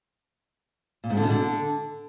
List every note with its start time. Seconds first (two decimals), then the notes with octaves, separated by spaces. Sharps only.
1.04 A#2
1.10 G#2
1.17 D3
1.23 B2
1.30 D3